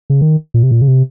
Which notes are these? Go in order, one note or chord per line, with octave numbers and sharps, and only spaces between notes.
C#3
D#3
A#2
C3
A#2
C#3
C3